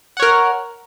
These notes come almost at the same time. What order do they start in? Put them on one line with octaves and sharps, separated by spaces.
F#5 C#5 A#4